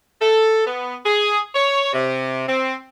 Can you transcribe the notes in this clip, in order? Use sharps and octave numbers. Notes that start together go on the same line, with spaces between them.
A4
B3
G#4
C#5
C3
C4